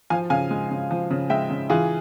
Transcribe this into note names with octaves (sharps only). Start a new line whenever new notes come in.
F3 F5 G#5
C#3 F5 G#5
G#3
C#3
F3
C#3
G#3 E5 G5
C#3
E3 F4 G#4